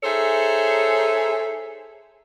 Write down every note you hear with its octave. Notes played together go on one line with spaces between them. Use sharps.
D#4 G#4 A4 C5 C#5 E5